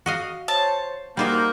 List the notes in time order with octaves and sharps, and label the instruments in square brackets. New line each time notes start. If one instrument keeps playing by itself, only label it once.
[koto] F#4 D#5 F5
[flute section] C5 C#5 [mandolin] A5
[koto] G3 F4 C5 [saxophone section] A#3 [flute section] D#4 F#4 G6